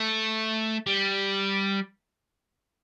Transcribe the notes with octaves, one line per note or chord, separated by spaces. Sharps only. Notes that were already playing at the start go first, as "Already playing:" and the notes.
Already playing: A3
G3